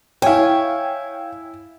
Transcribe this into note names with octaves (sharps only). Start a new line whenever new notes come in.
E4 C#5 F5 G5 G#5